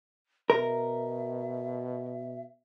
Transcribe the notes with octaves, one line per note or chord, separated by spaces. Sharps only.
B2 A#4 E5